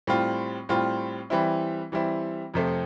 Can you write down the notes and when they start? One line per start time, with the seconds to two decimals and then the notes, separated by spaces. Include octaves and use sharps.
0.07 A2 G3 C4 F4
0.69 A2 G3 C4 F4
1.30 E3 G3 C4 E4
1.92 E3 G3 C4 E4
2.54 F2 C3 F3 A3 C4